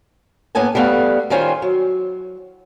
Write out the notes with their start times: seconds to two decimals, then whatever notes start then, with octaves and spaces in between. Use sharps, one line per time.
0.55 A2 A#3 B3 C#4 G#5 A5
0.75 G3 A3 B3 F5 F#5
1.30 D#3 G3 C#4 F4 C5 G#5
1.62 F#3